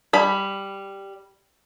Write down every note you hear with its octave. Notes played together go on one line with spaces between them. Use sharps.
G3 B5